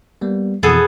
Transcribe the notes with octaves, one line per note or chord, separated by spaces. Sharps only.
G3 A#3 B3
F2 B2 E3 B3 G#4 A4